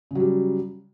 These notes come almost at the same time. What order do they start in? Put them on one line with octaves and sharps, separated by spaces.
C#3 F#3 G3